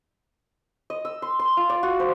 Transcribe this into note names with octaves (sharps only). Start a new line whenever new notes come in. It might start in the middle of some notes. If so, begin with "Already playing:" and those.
D#5
E6
C6
C6
F4
D5
F#4
C5